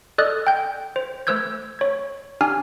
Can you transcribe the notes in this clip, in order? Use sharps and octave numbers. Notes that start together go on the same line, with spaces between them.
A4 D5 D#5 D#6 F6 F#6
G5 G6
C5
A3 B4 C5 E6 G6 G#6
C#5 G#6
D4 G4 G#5 F6